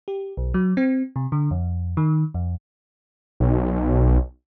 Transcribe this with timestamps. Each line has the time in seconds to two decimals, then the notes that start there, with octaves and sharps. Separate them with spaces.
0.08 G4
0.37 B1
0.54 F#3
0.77 C4
1.16 C3
1.32 D3
1.51 F2
1.97 D#3
2.34 F2
3.40 B1